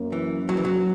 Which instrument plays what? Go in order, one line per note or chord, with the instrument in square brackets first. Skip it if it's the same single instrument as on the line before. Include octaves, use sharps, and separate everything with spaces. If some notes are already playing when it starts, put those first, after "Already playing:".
Already playing: [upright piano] F#2 A#3
[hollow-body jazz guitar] E3
F#3
E3
F#3